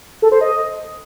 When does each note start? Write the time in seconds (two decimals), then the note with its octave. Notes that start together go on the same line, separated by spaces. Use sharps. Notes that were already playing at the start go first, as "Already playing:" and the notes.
0.22 A4
0.32 C5
0.41 D#5